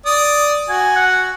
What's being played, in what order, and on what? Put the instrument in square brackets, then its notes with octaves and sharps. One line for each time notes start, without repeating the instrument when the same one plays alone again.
[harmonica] D5 D#6
[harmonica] F#4 [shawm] G#5
[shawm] F#5